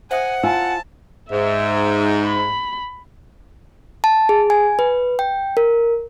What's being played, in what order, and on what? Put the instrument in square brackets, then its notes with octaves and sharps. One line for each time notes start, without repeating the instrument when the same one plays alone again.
[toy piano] C5 E5 D#6 [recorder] F#5 [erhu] G#5
[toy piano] E4 G#5 E6 [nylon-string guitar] F4 [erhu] A5
[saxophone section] G#2 [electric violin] E5
[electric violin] B5
[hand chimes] A5
G#4
G#5
B4
G5
A#4